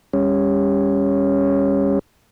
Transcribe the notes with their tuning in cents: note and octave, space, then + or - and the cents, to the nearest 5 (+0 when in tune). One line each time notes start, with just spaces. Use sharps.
G3 +30 C#4 +0